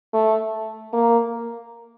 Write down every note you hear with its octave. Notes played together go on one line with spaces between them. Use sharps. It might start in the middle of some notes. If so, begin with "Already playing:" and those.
A3
A#3